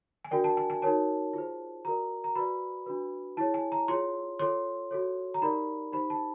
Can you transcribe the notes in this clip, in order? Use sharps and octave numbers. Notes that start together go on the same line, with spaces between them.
G#5
D4 F#4 A#4 D5 G5
A5
G#5
G#5
D#4 F#4 A#4 C#5 A5
F4 G#4 C5
F#4 A#4 D5 A#5
A#5
F#4 B4 D5 B5
D4 F#4 B4
E4 G#4 C#5 A5
G#5
A#5
F4 G#4 C#5 C6
F4 A4 C#5 C6
F#4 A4 C#5
A#5
D#4 G4 A#4 D5 B5
D#4 G4 C5 B5
A5